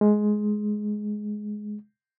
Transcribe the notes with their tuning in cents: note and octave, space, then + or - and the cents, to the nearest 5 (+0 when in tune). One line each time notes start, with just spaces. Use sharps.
G#3 +10